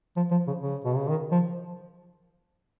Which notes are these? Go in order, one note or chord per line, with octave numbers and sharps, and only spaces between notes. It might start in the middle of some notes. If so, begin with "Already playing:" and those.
F3
F3
C#3
C#3
B2
C#3
D#3
F3